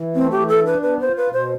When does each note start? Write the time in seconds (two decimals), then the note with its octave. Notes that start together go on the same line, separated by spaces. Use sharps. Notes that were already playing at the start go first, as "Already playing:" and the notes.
Already playing: E3
0.15 A3 C4
0.32 G4
0.38 E3
0.48 A4
0.61 D4
0.66 B4
0.83 B3 B4
1.01 F4 C5
1.17 B4
1.28 B2
1.33 C5